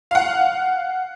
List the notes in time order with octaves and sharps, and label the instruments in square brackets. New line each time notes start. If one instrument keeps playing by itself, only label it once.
[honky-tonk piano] F5 F#5